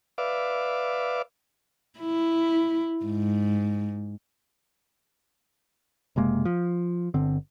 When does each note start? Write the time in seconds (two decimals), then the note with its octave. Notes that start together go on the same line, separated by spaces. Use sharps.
0.18 B4 D5 E5 F5 D6
1.99 E4
3.05 G#2
6.16 F#1 C3 G#3 A#3
6.45 F3
7.14 G1 D3 C4